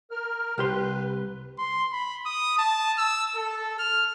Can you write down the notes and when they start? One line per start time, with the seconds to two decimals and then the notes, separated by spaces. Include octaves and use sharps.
0.11 A#4 F6
0.58 C2 G4 B4 C6
1.58 C6
1.92 B5
2.26 D#6
2.58 A5
2.98 E6
3.36 A4
3.79 F6